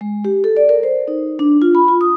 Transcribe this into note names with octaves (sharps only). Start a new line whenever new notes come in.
G#3
G4
A4
D5
A#4
C5
D#4
D4
F4
B5
F4
D#6